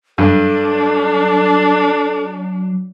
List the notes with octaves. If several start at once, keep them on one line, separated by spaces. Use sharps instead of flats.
G2 F#3 D4 A4